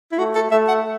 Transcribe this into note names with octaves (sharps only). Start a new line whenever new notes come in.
E4
A3 F#4
A4
A3 E5
F#5